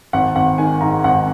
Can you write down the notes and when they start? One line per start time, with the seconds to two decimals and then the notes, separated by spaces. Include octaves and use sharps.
0.13 G#1 F#5
0.36 G#1 F#5
0.58 D#3 G#5
0.81 G#2 A#5
1.04 G#1 F#5